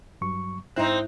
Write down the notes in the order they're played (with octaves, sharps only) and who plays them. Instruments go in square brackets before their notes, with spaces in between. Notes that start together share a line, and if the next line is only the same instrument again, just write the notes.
[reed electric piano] G2 F#3 C#6
[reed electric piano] G#2 E4 F#6 [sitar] C4 D#4